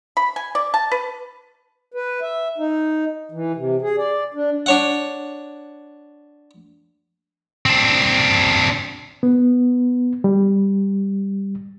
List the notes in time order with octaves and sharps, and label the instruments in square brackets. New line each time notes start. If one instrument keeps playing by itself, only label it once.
[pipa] B5
G#5
D5
A5
B4
[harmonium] B4
E5
D#4
E3
C3
G#4
D5
D4
[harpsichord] D4 C#5 F#5
[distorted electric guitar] C4 D4
[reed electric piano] B3
G3